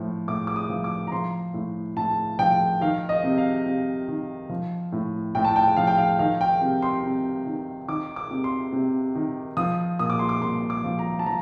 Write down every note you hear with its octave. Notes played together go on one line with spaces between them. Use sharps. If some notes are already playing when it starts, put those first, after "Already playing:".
Already playing: A2 F3
A2 D6
D6
D#6
F3
D6
A#5
F3 C6
A2
A2 A5
F3 G5
D#3 F5
D#5
C3
F5
C3
D#3
F3
A2
A2 G5
A5
G5
F3 F5
G5
F5
D#3 F5
G5
C3
C6
C3
D#3
D#3 D6
D6
C3
C6
C3
D#3
F3 D#6
A#2 D#6
D6
C6
D6
A#2 C6
D6
F3
A#5
A5
F3 A#5